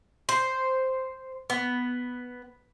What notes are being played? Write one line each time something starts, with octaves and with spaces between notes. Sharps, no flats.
C5
B3